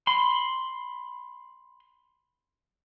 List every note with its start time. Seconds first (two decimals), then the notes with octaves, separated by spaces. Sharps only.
0.07 B5 C6